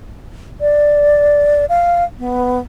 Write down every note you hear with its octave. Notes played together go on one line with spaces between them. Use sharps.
D5
F5
B3